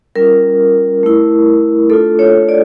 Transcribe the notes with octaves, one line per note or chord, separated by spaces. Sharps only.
G3 C#4 F4 A#4
A3 E4
A3 D4 F4 A4
C#5
D5